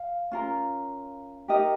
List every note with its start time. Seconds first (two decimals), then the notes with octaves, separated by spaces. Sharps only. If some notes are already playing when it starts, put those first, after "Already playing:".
Already playing: F5
0.31 C#4 F4 A#4
1.48 D#4 G4 A#4 D#5